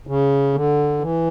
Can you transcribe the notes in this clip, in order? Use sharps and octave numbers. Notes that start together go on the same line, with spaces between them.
C#3
D3
E3